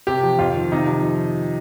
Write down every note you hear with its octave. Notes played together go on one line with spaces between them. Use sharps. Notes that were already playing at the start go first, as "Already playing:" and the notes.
C3 G4
F3
F2 F4
D#3
C3 D#4
F3